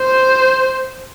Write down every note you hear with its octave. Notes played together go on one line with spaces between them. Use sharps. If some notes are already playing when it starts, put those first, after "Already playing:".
Already playing: C5